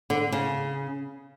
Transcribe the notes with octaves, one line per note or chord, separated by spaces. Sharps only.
D3
C#3